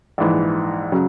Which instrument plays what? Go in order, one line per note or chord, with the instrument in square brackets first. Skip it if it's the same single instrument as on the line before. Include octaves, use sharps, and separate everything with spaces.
[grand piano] A#1 G#2 E3
C#3 F#3